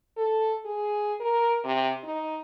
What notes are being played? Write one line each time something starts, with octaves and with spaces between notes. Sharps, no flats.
A4
G#4
A#4
C3
D#4